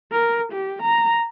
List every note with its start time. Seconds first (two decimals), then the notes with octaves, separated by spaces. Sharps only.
0.12 A#4
0.52 G4
0.82 A#5